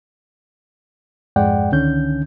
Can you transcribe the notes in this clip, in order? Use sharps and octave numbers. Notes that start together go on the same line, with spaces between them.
F2 G#2 G#3 D5 F#5 G5
C#2 D3 D#3 C#4 G6